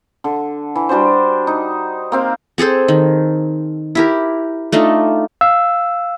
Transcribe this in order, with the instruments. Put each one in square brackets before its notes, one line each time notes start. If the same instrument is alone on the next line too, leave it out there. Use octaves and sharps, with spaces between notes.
[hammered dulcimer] D3
E3
G3 D4 F#4 C5
D#4
A#3 C4 F5
[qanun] C4 G#4 A4 C5
D#3
E4 G4 A#4
A3 D4 D#4 F4
[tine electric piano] F5 E6